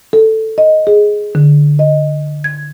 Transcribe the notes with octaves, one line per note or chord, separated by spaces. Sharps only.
A4
D#5
G#4
D3
D#5
G#6